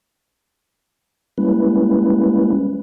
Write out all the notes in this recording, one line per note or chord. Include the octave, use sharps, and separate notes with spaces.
G3 G#3 A#3 C#4 E4 B4